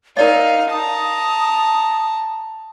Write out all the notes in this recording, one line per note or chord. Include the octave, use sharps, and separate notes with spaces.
D#4 A#4 D5 D#5 F5
A5 A#5 D#6